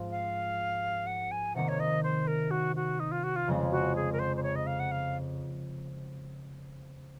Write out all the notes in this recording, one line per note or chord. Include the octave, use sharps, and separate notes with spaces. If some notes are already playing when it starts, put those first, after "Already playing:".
Already playing: G#2 F3 C4 F4
F5
F#5
G#5
C3 D#3 A#3 F#5
C#5
D#5
C5
A#4
F#4
F#4
D#4
F4
F#4
F4
F2 C#3 G#3 C4
F#4
G#4
A#4
C5
C5
C#5
D#5
F5
F#5
F5